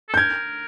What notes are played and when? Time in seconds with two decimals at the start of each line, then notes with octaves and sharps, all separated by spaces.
0.09 A4
0.14 G6
0.17 A#4 G#6